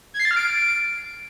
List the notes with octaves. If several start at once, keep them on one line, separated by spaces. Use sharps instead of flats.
G#6
C7
A6
F6
D7